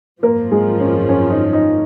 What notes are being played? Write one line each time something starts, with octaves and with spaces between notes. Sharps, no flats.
G#1 F#2 F3 A#3 A#4
G#3 G#4
C#4
C#4
D#4
D#4